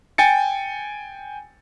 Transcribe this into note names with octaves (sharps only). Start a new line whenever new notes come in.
G5 G#5 A6 C#7